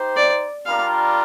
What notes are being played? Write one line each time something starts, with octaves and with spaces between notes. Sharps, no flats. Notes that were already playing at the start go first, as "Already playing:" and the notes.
Already playing: D#4 G4 C5
D5
G3 D4 F4 A#4 D5 F5